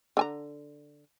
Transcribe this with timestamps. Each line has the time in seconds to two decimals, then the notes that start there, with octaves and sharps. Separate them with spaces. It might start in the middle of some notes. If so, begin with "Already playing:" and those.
0.17 D3 G#5 A#5